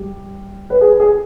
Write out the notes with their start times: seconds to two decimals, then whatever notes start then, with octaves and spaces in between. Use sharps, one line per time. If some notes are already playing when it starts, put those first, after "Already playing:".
Already playing: G3
0.70 B4
0.81 G#4
1.00 G#4